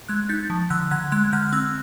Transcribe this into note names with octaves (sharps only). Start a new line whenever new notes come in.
G#3 F#6 G#6
D#4 G6 A6
F3
D3 E6 F#6
D3 F#6 G#6
G#3 F#6 G#6
D3 F6 G6
F6
C4 E6 F#6